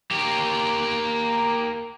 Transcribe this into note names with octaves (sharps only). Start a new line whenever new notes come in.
A#3 G4